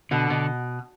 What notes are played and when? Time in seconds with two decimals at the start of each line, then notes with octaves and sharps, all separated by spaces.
0.11 B2 D3
0.30 B2